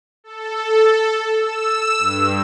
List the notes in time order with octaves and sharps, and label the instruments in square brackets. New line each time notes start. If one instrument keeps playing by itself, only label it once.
[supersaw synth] A4
E6
G2